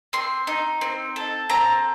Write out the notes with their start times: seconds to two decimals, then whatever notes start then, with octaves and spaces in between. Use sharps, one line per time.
0.13 C4 C6
0.47 D#4
0.81 C4
1.16 A4
1.50 C4 A#5